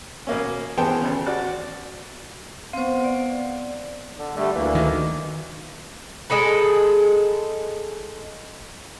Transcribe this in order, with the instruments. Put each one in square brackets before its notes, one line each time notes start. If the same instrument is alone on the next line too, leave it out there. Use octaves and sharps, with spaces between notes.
[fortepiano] B2 A#3 C#4
E3 B3 G#4 C5 G5 A5
G#1 C#3
F#4 D5
[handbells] B3 F5 [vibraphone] C4 C5
[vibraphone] D5
[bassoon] D3
[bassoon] D3 [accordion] G3 A3
[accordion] D2 A#3 [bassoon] E3
[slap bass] D#3
[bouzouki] G#3 D#4 A4 B4